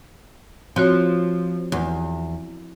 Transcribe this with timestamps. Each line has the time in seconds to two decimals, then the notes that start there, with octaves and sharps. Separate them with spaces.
0.76 F3 C4 F#4 C#5
1.72 E2